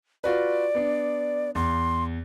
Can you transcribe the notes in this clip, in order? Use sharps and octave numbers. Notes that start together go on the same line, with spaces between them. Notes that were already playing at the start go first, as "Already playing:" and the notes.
F4 F#4 B4 D5
B3 D4
E2 C6